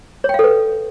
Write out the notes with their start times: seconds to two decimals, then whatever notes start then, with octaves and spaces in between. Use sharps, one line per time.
0.24 C#5
0.29 G5
0.34 F5
0.39 A4
0.44 B4